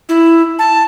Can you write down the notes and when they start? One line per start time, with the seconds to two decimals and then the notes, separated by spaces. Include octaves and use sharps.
0.09 E4
0.59 A5